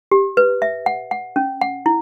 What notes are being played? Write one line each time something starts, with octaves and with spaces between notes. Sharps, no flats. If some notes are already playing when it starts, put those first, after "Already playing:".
G4
B4
E5
F#5
F#5
C#4
F#5
E4